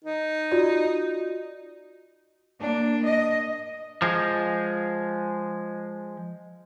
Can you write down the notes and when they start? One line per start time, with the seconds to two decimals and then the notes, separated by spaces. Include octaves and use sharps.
0.05 D#4
0.51 F4 F#4 D5
2.58 A#3 D4
3.04 D#5
4.02 F3 G#3